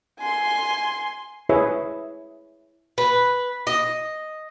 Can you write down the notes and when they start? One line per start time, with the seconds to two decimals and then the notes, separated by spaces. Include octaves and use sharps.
0.20 G#5 C6
1.49 E4 G#4 B4 C#5 E5
2.98 B4
3.67 D#5